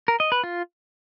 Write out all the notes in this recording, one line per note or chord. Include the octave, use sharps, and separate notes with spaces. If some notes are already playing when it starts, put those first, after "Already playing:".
A#4
D#5
B4
F4